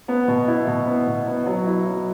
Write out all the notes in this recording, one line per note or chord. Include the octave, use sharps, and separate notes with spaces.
B3
B2
E4
B2
B3
B2
B3
F#3
E4
F#3